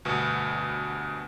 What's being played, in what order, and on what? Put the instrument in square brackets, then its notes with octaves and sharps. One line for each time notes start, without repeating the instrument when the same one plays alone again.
[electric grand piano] D2 G2 B2 B3